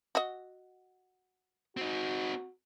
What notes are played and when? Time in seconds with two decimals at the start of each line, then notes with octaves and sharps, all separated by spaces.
0.15 F#4 D#5
1.77 C4 D#4 F#4